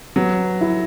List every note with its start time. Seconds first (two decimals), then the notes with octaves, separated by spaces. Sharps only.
0.16 F#3 B3
0.61 E4